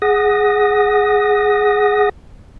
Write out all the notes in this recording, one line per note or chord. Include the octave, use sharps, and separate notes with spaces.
G#4 F#5 D#6 A#6